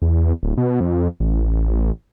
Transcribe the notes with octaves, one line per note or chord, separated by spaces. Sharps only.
E2
D1
B2
F2
A1